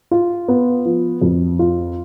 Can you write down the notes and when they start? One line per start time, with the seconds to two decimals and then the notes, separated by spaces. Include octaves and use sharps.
0.11 F4
0.48 B3
0.85 F3
1.21 F2
1.59 F4